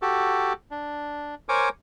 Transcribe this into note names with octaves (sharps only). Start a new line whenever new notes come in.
F#4 G4 A4
D4
A#4 C5 C#5 G#5 D6